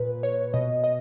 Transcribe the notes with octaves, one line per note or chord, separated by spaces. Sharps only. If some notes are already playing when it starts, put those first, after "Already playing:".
Already playing: A#2 B4
C#5
B2 D#5
D#5